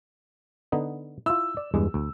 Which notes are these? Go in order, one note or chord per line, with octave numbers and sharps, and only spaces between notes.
D3 B3 D#4
E4 F4 E6
D5
E2 G2 G#3
D2